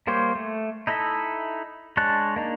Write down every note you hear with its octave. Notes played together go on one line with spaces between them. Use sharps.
G3 A#3 G4 C5 C#5
A3
D#4 E4 A4 D#5 E5
G#3 D4 C#5 A5 F#6
A#3 D4 D#4